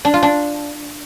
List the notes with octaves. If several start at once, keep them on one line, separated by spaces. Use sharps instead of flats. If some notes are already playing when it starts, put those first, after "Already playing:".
D4
F4
D4